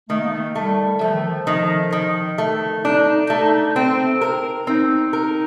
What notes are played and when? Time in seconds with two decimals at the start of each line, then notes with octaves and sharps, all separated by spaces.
0.09 D#3 A3
0.19 A#3
0.27 A3
0.55 G3 A3
1.01 F3 A3
1.12 D#3
1.22 F3
1.47 D#3
1.92 D#3
2.38 A3
2.84 D4 D#4
3.30 A3
3.76 C4
4.21 A#4
4.67 C4 D#4
5.13 A#4